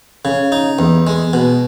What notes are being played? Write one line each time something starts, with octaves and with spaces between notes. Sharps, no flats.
C#3
D#4
E2
G#3
B2